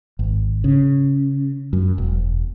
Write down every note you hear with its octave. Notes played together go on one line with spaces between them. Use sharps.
G#1
C#3
F#2
E1